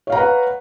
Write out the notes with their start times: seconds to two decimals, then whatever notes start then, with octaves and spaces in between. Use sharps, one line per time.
0.07 C#5
0.10 F5
0.12 A#5
0.15 F#5
0.17 B4